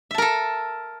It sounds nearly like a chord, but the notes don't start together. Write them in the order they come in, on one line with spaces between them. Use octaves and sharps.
E5 A5 A#4 A4